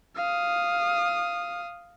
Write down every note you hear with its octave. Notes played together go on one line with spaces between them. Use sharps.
F5 D#6